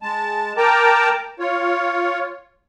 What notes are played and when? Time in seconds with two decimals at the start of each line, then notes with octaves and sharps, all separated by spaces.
0.02 G#3 A5
0.57 A#4 G5 A5 A#5 D6
1.39 F4 C#5